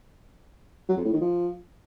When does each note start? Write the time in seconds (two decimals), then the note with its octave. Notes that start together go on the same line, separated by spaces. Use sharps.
0.89 F#3
0.97 F2
1.05 A2
1.13 D#3
1.21 F3